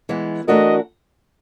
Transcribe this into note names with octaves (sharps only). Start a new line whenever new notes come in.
E3 G#3 B3
E3 A3 D4 F#4 A#4 D#5